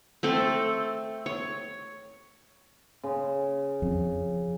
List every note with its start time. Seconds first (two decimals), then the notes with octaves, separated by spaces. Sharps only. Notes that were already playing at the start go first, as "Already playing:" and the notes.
0.23 A3 C4 A4
1.26 C#5
3.03 C#3
3.82 F2